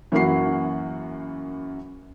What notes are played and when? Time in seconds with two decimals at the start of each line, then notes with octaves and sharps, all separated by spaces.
0.12 F#2 E3 A#3 E4 F#4 C7